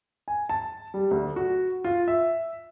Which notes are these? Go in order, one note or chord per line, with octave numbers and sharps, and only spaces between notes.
G#5
A5
G3
D2
F#4
F4
E5